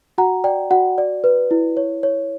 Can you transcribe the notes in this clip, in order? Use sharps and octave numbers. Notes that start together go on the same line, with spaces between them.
F#4 F#5 A#5
D5 G5
F#4 F#5
D5
B4
E4
C#5
C#5